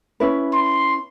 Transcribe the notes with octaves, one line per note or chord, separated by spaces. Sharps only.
C#4 E4 B4
C6